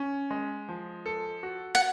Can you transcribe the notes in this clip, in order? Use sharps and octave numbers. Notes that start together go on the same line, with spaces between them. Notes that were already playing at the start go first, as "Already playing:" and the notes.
Already playing: C#4
G#3
F3
A4
F#4
F#5